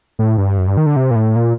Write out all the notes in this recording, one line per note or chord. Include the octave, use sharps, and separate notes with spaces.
A2
G2
F#2
G2
D#3
D3
C3
A#2
A2
A#2